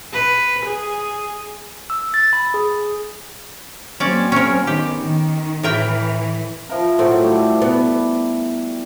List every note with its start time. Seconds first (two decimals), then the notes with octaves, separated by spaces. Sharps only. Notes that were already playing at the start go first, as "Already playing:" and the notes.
0.12 B4
0.65 G#4
1.90 E6
2.14 A6
2.33 B5
2.54 G#4
4.00 F#3 A#3 C4 C#4 D5
4.32 C#4 A#4
4.67 D#3 B3 G4
5.02 D#3
5.63 A2 E3 A#4 G5
6.69 F3 E4 A#4
6.99 A2 F#3 A3 C4
7.23 G3 A4
7.62 B3